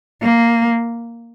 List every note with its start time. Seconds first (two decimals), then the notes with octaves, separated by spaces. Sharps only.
0.23 A#3